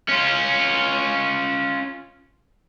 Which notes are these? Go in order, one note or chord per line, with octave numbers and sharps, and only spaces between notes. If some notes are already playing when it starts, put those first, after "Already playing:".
C#4 F4